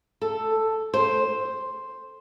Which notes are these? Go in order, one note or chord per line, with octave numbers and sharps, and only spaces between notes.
A4
C5